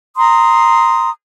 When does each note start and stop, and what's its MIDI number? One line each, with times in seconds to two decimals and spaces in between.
0.17 1.09 82
0.17 1.09 84
0.17 1.09 87